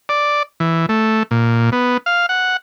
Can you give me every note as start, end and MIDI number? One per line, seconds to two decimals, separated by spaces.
0.09 0.43 74
0.60 0.86 52
0.89 1.23 57
1.31 1.70 46
1.72 1.97 59
2.06 2.26 77
2.29 2.57 78